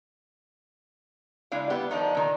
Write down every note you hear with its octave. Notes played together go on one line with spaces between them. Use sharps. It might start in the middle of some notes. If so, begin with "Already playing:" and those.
C#3 G#3 D4 E4 F5
G3 B3 E4 G4
D#3 F3 D4 D#4
A#2 D#3